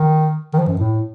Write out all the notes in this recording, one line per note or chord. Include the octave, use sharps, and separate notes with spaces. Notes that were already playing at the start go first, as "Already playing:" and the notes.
Already playing: D#3
D#3
F3
F#2
A2